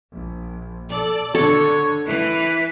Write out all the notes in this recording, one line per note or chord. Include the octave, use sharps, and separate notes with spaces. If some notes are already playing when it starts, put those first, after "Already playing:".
A#1
A4 D5
D3 A4 C#5
E3 B4